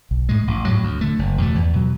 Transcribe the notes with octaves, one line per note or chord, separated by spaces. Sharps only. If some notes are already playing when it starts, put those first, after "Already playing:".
B1
A2 G#3
A1
A2 F#3
D2
D3 A3
F#1
E2 B2 A3
E2
B2 F#3